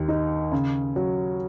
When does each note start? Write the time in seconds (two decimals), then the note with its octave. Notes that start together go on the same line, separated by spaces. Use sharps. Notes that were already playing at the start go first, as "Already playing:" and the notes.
Already playing: D#2 D#3
0.08 D#4
0.52 C#3
0.96 F#3